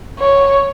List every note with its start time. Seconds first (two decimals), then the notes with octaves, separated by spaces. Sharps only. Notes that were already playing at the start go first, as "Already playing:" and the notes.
0.19 C#5